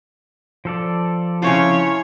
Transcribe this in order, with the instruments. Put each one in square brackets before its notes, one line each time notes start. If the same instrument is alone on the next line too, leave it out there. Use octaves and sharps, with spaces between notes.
[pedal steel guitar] F3 A4 D5
[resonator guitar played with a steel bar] C#3 C4 F4 [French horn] E4 [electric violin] C#5